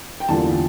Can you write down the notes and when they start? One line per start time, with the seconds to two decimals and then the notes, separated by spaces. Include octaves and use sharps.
0.20 G5
0.29 E2 D3 G3 A#3 F4 A5